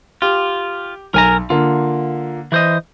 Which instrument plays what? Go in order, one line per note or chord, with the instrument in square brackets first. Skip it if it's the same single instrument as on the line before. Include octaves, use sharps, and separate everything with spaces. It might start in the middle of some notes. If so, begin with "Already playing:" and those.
[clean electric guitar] F4 [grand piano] G4
[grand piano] B1 [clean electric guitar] A#4 G#5 A#5
[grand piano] D3 A#3 [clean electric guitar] F4
[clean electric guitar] E3 C5 D#5